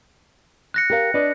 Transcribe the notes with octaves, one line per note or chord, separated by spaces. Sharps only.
F#6 A#6 C#7
G4 A#4 F5
D4 B4 D#5